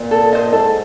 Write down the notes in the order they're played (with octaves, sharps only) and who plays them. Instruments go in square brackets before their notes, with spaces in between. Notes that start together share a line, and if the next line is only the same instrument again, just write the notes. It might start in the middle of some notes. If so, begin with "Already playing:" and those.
Already playing: [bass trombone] A#2
[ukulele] A4
C5 D#5
[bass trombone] G#2 [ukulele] A4